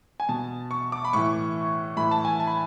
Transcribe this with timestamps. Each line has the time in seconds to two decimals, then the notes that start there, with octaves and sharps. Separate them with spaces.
0.20 G#5
0.29 B2 A5
0.71 C#6
0.92 D6
1.05 B5
1.13 A2 E3 C#6
1.97 A2 E3 B5
2.11 A5
2.25 G#5
2.40 A5
2.47 B5